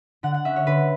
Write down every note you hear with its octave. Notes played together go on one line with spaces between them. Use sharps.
D3 F#5
F#5
C#4 E5
C#5
D3 B4